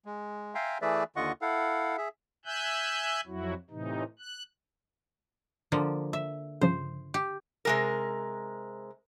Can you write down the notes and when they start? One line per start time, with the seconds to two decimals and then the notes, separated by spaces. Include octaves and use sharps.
0.05 G#3
0.55 E5 F5 G5 G#5 A#5 C6
0.82 E3 A3 G#4 B4 D5 E5
1.16 D#2 D3 F4 D#5 F#5 C#6
1.42 E4 A4 F5 F#5
1.98 G#4 E5
2.45 E5 G#5 E6 F#6 G6
3.27 F2 F#3 E4 F#4
3.70 A2 C3 E3 D#4
4.19 F#6
5.72 D3 F3 A#3
6.13 E5
6.61 G2 C#3 F3 C5
7.14 G4
7.65 C3 G#3 A#4